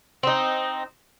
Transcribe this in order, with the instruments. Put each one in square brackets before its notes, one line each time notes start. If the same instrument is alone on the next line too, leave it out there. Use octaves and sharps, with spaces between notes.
[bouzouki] C4 D#4